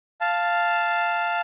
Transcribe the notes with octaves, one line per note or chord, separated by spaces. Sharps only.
F5 A5